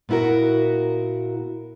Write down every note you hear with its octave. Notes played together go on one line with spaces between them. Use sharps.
A#2 B3 E4 F#4 A#4